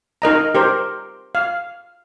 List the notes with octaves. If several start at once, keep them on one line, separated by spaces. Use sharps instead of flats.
D#4 A#4 D#5 A#5
G4 A#4 C5
F5